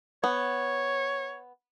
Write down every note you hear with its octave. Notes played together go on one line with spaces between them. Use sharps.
B3 C#5